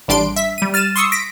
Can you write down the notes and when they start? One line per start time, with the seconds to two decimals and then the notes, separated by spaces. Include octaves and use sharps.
0.08 A1 G3 D4 C6 D7
0.36 E5 B6
0.58 G3 D#7
0.74 F6 A6 D#7 E7
0.96 C6 C#6 D#6 E6 C#7
1.12 A#6 B6 D7